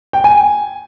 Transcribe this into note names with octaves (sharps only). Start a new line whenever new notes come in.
G5
G#5